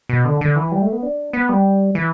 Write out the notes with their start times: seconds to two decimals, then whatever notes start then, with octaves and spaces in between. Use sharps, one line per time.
0.09 B2
0.25 D3
0.41 D3
0.56 E3
0.72 G3
0.82 A3
0.93 B3
1.03 D4
1.33 B3
1.49 G3
1.95 E3